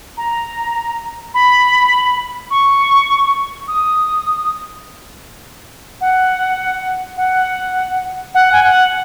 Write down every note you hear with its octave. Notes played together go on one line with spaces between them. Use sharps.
A#5
B5
C#6
D#6
F#5
F#5
F#5
G#5
F#5